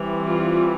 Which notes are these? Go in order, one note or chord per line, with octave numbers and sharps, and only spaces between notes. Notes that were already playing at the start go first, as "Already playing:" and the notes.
Already playing: E3 G3 C4
F4